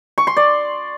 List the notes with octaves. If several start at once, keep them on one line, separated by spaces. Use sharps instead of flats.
C#6
C6
D5